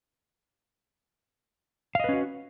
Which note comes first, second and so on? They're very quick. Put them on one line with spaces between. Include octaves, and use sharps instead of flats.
F5 D#5 B4 C#4 F#4